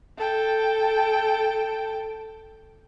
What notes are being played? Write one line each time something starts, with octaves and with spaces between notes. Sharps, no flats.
A4 G5